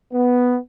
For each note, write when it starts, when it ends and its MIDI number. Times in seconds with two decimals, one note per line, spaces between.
0.12 0.56 59